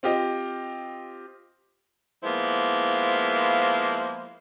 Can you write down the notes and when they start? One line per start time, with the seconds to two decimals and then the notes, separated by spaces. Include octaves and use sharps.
0.03 C4 F4 G4 D#5
2.24 F3 G#3 A#3 B3 E4 C5